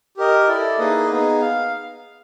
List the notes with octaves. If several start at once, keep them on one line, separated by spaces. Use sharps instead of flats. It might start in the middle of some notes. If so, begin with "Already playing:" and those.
G4 A#4 D#5
E4 A4 D5
A#3 D#4 G#4 B4 D#5
B3 D#4 G#4
F5